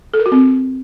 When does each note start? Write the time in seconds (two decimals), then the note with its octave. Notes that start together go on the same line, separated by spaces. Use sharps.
0.14 A4
0.20 A#4
0.26 F#4
0.32 C4